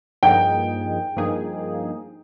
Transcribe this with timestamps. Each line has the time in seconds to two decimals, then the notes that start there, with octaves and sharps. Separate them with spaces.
0.23 G2 F3 A#3 D#4 G#4 G5
1.17 G2 F3 A#3 D#4 G#4